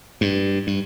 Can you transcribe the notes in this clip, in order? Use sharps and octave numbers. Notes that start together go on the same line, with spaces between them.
G2
G2